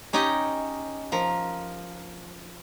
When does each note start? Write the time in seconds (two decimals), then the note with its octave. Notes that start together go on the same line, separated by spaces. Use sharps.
0.13 C#4 D#4 G4 D#5
1.12 F3 A#4